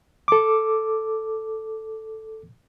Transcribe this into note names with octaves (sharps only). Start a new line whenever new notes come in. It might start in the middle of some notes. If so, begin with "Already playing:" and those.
A4 D6